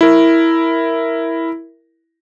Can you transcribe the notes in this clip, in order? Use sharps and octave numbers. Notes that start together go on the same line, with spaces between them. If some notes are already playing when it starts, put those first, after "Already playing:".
E4 A#4